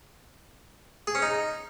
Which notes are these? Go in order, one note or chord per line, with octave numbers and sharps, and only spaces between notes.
G#4
C#4
D#4